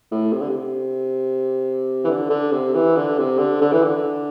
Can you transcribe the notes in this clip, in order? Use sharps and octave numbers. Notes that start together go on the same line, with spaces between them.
A2
C3
D3
C3
E3
D3
D3
C3
E3
D3
C3
D3
D3
E3
D3